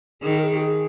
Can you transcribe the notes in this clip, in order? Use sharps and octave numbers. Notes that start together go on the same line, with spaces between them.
D#3 G#4
A#4
G#4
G4
G#4